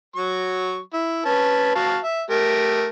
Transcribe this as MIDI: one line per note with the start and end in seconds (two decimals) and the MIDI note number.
0.16 0.79 54
0.16 0.79 85
0.94 1.25 64
1.25 1.74 61
1.25 1.74 71
1.25 1.74 81
1.75 1.97 66
1.75 1.97 77
1.75 1.97 81
2.04 2.22 76
2.30 2.87 57
2.30 2.87 67
2.30 2.87 70